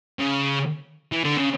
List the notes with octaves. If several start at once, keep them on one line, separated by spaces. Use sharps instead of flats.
C#3
E3
D3
C#3